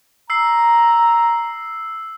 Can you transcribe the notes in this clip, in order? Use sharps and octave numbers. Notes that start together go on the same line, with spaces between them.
A#5 E6 C7